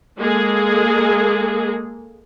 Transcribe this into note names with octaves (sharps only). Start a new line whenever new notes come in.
G#3 A#3 G#4 A4